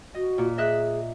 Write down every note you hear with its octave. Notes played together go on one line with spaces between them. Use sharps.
F#4 D#5
A#2
G#4 D#5 E5 F#6